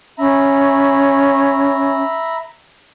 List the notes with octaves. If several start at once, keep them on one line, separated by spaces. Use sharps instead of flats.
C#4 E5 A#5 B5